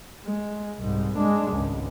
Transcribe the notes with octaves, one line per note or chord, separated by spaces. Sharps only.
G#3
C2 G#2
G#3 D4
G#1 C#2